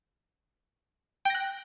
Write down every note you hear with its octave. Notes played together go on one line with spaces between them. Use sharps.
G5 F#6 A#6